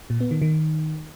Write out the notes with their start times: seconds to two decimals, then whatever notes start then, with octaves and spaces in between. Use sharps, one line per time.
0.10 A#2
0.20 B3
0.31 D#3
0.42 D#3